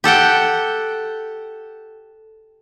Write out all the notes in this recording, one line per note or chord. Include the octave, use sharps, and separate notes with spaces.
G4 A4 F#5 G5